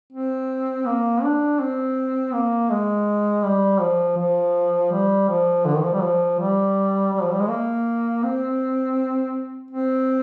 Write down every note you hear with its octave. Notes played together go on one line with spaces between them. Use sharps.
C4
A#3
D4
C4
A#3
G#3
G3
F3
F3
G3
F3
D3
D#3
F3
G3
F3
G3
G3
F3
G3
G#3
A#3
C4
C4